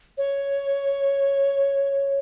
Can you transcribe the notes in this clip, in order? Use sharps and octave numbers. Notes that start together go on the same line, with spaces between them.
C#5